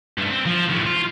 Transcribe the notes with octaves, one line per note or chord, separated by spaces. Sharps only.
G2 A3
C4
F3
D#2 A2
F4